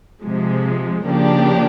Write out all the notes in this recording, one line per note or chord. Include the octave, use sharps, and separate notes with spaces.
C3 F3 G#3
C#3 F3 A#3 D4 G4